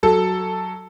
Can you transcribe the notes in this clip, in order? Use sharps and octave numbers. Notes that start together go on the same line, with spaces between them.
F#3 A4